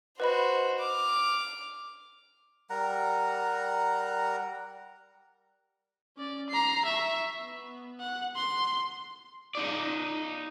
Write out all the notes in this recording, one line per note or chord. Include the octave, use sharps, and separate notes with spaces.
F#4 B4 C5 D#5 B5
D6 F6
G3 A#4 F#5 A#5
C#4 D5
A#5 C7
E5 C#6
B3
F#5
C6
D#4 D5